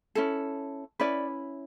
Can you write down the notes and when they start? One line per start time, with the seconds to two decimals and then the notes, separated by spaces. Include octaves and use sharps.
0.15 C#4 E4 A4
1.00 C#4 E4 B4 D5